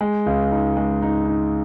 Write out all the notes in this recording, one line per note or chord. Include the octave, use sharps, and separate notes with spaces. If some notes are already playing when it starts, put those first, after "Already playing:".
G#3
C#2
D#4
G#3
D#4
D#4